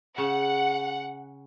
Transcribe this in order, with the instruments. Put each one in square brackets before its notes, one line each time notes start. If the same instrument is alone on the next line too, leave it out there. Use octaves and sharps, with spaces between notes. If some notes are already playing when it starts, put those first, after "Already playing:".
[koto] C#3 [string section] F#5